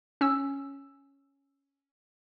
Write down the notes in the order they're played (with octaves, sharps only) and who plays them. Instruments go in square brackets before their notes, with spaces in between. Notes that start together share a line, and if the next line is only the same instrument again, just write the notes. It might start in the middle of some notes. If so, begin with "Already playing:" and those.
[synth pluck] C#4 E6